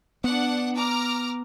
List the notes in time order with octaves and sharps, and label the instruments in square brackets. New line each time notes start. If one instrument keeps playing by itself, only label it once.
[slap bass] B3 [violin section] D4 F#5
[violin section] A#5 D6 F6